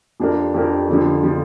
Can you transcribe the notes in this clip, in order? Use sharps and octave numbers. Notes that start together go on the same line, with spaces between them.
F2 F3 D4 G4 A#4
F2 F3 D4 G4 A#4
F2 D3 F3
D3 F3